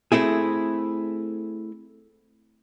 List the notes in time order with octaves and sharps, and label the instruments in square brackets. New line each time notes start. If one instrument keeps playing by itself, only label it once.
[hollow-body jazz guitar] A3 C4 E4 G#4